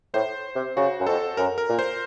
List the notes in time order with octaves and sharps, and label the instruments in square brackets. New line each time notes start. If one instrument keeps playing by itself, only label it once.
[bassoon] A2 [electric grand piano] C5
[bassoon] C3
[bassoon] C#3 [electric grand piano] F#4
[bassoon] F#2
[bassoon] F2 [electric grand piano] A4
[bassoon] F#2 [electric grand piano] A#4
[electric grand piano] A#4
[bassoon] A#2
[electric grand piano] C5